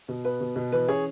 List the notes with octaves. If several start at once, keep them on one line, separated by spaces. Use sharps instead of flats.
B2
B3 B4
B2
B2
E3 B4
C#4 G#4 C#5